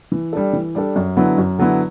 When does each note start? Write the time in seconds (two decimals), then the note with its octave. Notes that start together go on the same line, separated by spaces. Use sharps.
0.12 E3
0.33 G3 D4 A4
0.53 E3
0.75 G3 D4 A4
0.96 F#2
1.17 D3 F#3 B3 E4
1.38 F#2
1.59 D3 F#3 B3 E4